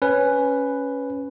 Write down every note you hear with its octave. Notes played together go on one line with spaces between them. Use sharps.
C#4 B4